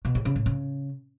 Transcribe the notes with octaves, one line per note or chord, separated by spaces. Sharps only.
B2
A2
C#3
A2
C#3